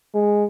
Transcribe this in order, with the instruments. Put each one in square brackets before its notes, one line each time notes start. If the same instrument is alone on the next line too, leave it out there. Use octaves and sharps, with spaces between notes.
[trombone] G#3